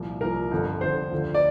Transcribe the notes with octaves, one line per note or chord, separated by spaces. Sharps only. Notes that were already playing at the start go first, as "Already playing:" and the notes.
Already playing: C2 A#2 F3
C2 A#2 F3 A#4
G1 F2 D3
G1 F2 D3 C5
D2 D3 F3
D5